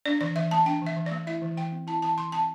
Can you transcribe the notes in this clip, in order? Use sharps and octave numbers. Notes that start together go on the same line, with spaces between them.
D4 D5
E3 D5
E3 E5
A3 A5
D4 G5
E3 E5
E3
D5
A3
E4 E5
E3
E3 G5
C4
E4 A5
E3 A5
E3 C6
C4 A5